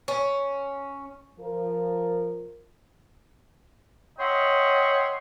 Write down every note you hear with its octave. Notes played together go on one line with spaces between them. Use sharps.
C#4
F3 A#4
C#5 D#5 E5 F#5 G5 C6